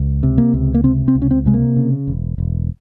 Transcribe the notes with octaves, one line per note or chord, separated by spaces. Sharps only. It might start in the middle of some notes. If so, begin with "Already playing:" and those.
Already playing: C#2
C3
A#3
C#2
A#3
C3 C4
C4
C#2
C#4
C4
C3 G#3
A#3
C#3
E1
E1